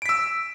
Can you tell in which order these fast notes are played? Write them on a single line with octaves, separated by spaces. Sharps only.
D7 B6 E6